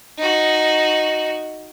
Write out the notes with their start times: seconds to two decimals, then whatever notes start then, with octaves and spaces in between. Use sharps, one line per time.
0.19 D#4 F#4